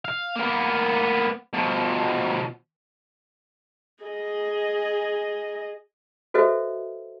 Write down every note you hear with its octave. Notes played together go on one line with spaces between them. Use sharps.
F5
A#3 B3
B2 F3
G#4 D#5
F#4 A4 B4 C5 D#5 E5